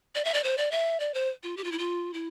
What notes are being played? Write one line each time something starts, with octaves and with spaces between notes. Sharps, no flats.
D5
E5
D5
C5
D5
E5
D5
C5
F4
G4
F4
E4
F4
E4